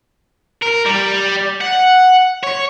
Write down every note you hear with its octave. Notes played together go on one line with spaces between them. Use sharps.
A#4
G3
F#5
C#5